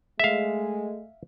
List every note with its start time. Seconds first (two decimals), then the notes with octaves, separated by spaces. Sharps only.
0.20 G#3 A3 E5 F5